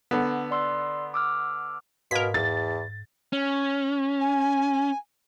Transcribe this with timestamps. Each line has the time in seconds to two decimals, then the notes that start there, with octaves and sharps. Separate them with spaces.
0.11 D3 B3
0.51 D5 C6 E6
1.14 D6 E6 F6
2.11 G#2 B2 A#4 F5 G#6 B6
2.34 E2 A6
3.33 C#4
4.20 G#5